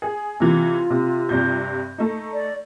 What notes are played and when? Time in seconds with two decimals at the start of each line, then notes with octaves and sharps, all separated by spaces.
0.02 G#4
0.40 C3 E3 F4
0.90 C3
1.29 G2 C3 G6
1.98 A3 D#4
2.34 D5